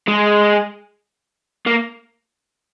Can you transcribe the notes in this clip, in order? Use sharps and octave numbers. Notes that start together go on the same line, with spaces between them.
G#3
A#3